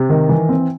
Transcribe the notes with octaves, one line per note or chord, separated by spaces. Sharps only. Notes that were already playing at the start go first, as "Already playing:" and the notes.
Already playing: C3
D#3
E3
C4